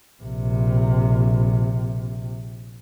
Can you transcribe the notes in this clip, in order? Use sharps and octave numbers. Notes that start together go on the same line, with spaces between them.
A#1 C3